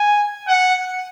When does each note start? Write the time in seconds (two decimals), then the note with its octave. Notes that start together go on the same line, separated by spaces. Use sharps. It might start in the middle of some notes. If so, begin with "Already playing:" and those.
Already playing: G#5
0.48 F#5